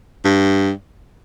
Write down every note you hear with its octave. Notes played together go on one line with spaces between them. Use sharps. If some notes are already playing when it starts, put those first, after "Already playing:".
G2